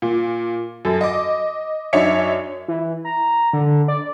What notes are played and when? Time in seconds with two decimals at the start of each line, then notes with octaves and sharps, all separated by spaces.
0.02 A#2
0.85 F#2 A4
1.01 D#5 D6
1.93 F#2 D4 D#4 C#5 E5 C#7
2.68 E3
3.05 A#5
3.53 D3
3.88 D5